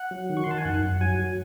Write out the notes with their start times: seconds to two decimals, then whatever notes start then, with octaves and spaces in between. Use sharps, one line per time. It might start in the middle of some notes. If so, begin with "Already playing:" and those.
Already playing: F#5
0.11 F#3
0.29 D#3
0.37 C#6
0.44 C6
0.47 D#3 A5
0.58 G#5
0.65 F#2 F#5
0.83 F#2
1.01 F#3 G#5
1.19 F#3